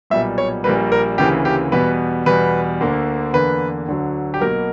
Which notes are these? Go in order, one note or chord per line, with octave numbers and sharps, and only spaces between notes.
B1 A#2 G3 B3 E5
C#5
A#1 A#2 G3 A#3 B4
A#4
D2 C#3 E3 A#3 G4
G4
E2 B2 G3 B3 B4
E2 B2 G3 B4
D2 D3 A#3
E2 D3 A#3 B4
D2 D3 F#3
G4
B1 B2 A#3 A#4